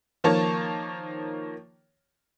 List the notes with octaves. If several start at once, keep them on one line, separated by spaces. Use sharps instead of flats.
D#3 F3 A#3 C#5 A5 C#6